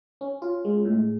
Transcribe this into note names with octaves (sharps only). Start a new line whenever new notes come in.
C#4
F4
G#3
A2